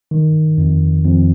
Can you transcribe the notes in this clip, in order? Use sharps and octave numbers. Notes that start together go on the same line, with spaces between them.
D#3
F2
F2